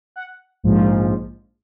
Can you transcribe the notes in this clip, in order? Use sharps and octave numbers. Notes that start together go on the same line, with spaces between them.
F#5
A#1 G#2 F3